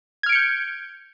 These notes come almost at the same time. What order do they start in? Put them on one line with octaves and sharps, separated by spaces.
G#6 F6 D7 C#7 G6